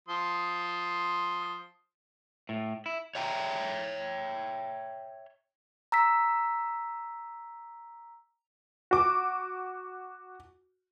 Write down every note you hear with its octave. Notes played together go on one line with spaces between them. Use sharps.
F3 C6 D#6
A2
E4
C#5 E5 G5 A#5
A#5 E6 B6
F#4 D6